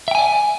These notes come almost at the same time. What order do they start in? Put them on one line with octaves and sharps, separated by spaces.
E5 G5 G#5 D5